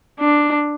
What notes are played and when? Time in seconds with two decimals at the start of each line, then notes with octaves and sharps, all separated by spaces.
0.20 D4